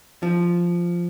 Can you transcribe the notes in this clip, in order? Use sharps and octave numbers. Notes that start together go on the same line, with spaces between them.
F3